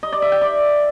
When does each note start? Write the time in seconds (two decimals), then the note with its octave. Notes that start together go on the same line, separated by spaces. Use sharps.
0.03 D#5
0.13 D5
0.22 E5
0.32 G5
0.41 D5